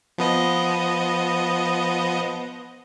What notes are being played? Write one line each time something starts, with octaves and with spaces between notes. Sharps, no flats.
F3 B3 D#5